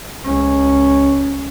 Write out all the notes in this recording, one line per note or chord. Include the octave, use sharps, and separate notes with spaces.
C#2 C#4